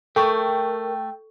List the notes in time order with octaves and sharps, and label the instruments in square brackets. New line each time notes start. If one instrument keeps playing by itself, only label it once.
[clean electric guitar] A3 [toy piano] A4 C#6 [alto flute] A#4 [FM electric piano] G5